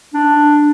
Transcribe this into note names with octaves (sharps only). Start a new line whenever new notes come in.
D4